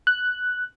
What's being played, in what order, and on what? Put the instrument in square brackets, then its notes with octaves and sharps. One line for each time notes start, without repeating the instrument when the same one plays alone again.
[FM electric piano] F#6